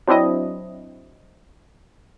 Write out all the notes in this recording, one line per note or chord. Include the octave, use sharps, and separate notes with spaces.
F#3 C4 D4 E4 D#5